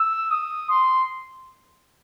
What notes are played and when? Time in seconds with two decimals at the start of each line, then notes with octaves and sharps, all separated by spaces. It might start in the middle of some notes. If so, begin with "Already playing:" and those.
Already playing: E6
0.31 D#6
0.70 C6